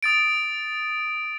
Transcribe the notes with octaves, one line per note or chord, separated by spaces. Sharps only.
D#6 A6 D7